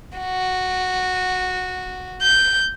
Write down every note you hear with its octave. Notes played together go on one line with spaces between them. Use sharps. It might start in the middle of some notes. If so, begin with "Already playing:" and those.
F#4
G6